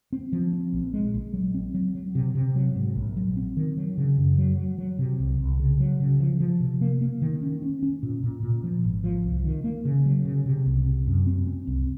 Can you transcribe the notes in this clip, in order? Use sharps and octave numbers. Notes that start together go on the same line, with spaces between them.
C4
F3
C4
A#1
G#3
A#1
F#3
C4
F#3
F#3
C3
C3
F#3
G#2
A#1
F#3
C4
D#3
F#3
C#3
F#2
F#3
F#3
F#3
C3
C2
C2
C#3
F#3
C#3
F3
F3
C3
A#3
A#3
D#3
C#4
C#4
C#4
A#2
A#2
A#2
F3
G#1
F3
C2
D#3
A#3
C#3
F#3
C#3
C3
C2
C3
F#2
C4
C4
C2